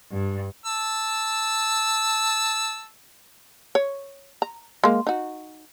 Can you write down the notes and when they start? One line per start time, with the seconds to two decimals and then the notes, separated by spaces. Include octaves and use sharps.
0.11 G2
0.66 A5 E6
3.75 C#5
4.42 A#5
4.84 G#3 A#3
5.07 D#4 F#4